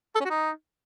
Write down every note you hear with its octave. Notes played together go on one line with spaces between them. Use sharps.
A4
C#4
F#4
D#4